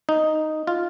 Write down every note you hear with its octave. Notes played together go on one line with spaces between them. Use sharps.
D#4
F4